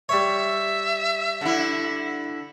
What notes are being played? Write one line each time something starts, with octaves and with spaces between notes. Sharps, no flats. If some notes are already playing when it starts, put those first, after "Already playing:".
G3 C#5 E5
D3 E4